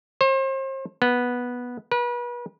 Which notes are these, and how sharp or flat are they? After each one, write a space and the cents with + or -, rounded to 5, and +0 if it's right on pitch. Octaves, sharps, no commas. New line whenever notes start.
C5 +40
B3 -10
B4 -35